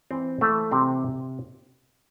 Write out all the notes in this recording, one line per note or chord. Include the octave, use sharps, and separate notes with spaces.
E3 C4
E3 A3
C3 C4